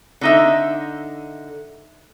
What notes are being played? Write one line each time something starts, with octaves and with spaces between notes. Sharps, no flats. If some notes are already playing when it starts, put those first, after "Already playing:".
D3 D#4 E5